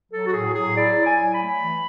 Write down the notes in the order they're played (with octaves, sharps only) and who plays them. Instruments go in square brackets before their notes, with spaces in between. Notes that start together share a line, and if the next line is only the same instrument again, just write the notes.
[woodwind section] F#3 A4
F#4
A2 G#4
F#3 G#4
E4 D5
E4
G#5
F#3
B5
A3
E3